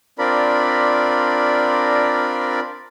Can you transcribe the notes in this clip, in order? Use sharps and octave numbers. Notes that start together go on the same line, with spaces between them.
C4 D4 F4 A#4 D5 B5